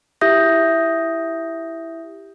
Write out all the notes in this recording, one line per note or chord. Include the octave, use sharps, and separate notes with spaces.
E4 G4 E5 D#6 G6 A#6